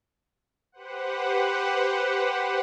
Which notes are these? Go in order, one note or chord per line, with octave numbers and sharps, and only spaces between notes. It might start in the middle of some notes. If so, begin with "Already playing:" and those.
G4 B4 C5 F#5